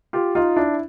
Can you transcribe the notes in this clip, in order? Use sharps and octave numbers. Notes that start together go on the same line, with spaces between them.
F4 G4
D#4 F4
D4 E4